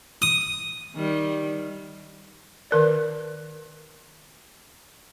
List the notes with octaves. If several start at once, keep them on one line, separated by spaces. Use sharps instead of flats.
D#6
D#3 G3
D#3 A#4 D5